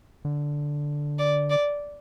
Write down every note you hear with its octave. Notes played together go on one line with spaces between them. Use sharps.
D3
D5
D5